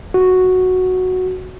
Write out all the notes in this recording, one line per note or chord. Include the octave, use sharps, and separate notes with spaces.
F#4